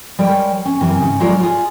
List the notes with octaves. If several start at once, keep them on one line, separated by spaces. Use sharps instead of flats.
G3 G#3 A#4 C#5 G5
C#4
F#2 C3 E3 A#4 G#5
G#2 C#3
F#3 G#3 F4 A#4 C#5 D5
F4 G#4